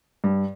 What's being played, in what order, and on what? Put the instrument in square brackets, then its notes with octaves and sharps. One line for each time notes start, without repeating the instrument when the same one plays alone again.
[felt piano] G2